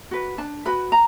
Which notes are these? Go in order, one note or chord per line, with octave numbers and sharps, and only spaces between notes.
F#4 B4
D4 A5
F#4 B4 B5
A#5